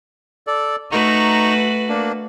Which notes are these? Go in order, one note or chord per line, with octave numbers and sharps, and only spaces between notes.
A4 D5
A3 D#4 F#4 B4 A#5 C#6
A#3 D4